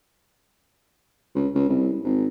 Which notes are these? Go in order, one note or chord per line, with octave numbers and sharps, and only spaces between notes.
C#2
C#2
C2
G#1